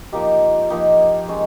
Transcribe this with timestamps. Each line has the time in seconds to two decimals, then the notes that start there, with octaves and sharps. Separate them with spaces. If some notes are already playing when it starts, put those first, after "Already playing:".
0.12 F3 A#3 D#4 G4
0.70 F3 A#3 D#4 G4
1.28 G#3 C#4 F4